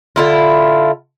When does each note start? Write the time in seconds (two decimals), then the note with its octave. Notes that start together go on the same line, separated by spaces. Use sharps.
0.16 D3 E4 F4